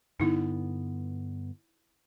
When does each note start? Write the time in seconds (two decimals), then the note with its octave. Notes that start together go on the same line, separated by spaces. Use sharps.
0.20 G2 D3 B3 D#4 E4